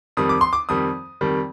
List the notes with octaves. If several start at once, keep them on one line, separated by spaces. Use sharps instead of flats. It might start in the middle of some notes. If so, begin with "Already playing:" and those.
F2 D#3 G3 D#6
D6
C6
D6
F2 D#3 G3 D#6
F2 D#3 G3